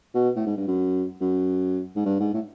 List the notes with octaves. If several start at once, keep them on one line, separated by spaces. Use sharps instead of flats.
B2
A2
G#2
G2
F#2
F#2
G#2
G2
G#2
A2